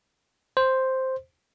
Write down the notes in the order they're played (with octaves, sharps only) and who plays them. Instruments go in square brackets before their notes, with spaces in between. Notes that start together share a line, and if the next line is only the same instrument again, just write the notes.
[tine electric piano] C5